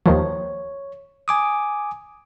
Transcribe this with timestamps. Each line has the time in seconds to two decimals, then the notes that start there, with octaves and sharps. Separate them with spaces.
0.06 D#2 D#3 F3 C#5
1.28 G#5 D6 D#6